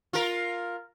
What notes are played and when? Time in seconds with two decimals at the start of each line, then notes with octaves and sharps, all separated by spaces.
0.13 F4 A#4